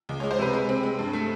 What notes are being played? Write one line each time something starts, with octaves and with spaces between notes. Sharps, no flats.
C#2
C#5
G#3
C5
C3 B4
G#3
C4
G#3
G2
A3